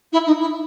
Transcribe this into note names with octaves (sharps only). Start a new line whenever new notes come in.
E4
D#4
E4